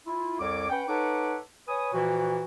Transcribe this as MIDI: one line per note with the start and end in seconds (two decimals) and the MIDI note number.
0.07 0.37 64
0.07 0.37 65
0.40 0.68 36
0.40 0.68 41
0.40 0.68 73
0.40 0.68 86
0.70 0.84 61
0.70 0.84 71
0.70 0.84 78
0.70 0.84 79
0.88 1.36 63
0.88 1.36 69
0.88 1.36 71
0.88 1.36 73
0.88 1.36 78
0.88 1.36 86
1.68 1.89 71
1.68 1.89 73
1.68 1.89 80
1.68 1.89 87
1.94 2.44 46
1.94 2.44 52
1.94 2.44 53
1.94 2.44 66